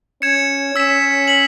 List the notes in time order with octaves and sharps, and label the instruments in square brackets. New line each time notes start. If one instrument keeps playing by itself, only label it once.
[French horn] C#4 [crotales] G#6 C#7 E7
[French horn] C#4 [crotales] E6 B6 E7
[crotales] B6 F#7